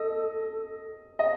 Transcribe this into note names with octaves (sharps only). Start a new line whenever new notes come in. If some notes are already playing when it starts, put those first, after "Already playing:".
Already playing: A4 D#5
D#5